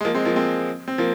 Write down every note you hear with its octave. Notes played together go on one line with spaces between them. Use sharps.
G#3
F3 A#3
G#3 C4
F3 A#3
G#3 C4
C4
F3 A#3